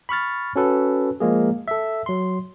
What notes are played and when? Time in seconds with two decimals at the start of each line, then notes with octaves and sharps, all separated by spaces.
0.09 B5 C#6 F6 A6
0.56 C#4 F#4 A4 B4
1.20 F3 G#3 A#3 G#4
1.68 A4 E5
2.06 F#3 C6